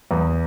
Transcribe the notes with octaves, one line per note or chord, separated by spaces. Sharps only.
E2